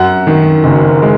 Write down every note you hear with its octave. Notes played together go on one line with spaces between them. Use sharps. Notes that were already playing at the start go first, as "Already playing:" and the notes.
Already playing: F#2 F#5
D#3
F#1
G#3